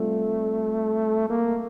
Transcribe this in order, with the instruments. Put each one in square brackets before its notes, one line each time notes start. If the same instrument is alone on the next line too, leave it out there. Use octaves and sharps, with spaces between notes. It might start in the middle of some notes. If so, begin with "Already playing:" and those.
Already playing: [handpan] G3 C4 F4 A4 [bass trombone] A3
[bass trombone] A#3